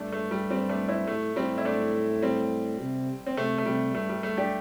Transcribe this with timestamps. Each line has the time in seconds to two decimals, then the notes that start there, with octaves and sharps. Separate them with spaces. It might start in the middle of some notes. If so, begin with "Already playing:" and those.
Already playing: G2 A3 D4
0.12 A3
0.31 G3
0.50 G3 C4
0.69 A3 D4
0.89 C4 E4
1.07 A2 A3
1.36 A2 G3 C4
1.58 E4
1.65 A3 D4
2.22 G3 C4
2.80 C3
3.27 C4
3.36 C3 A3
3.58 A3
3.65 C3 G3
3.95 G2 A3
4.09 G3
4.23 G2 A3
4.37 D4 G4